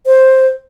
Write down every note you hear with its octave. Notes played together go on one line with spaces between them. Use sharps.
C5